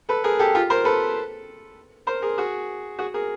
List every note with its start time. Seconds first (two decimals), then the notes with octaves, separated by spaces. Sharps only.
0.09 A4 B4
0.24 G#4 A#4
0.39 G4 A4
0.55 F4 G4
0.70 A#4 C5
0.85 A4 B4
2.07 A#4 C5
2.22 G#4 A#4
2.38 F#4 G#4
2.99 F#4 G#4
3.14 G#4 A#4